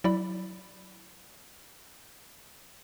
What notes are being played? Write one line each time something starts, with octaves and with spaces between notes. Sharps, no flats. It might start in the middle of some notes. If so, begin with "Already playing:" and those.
F#3 E4 D5 B5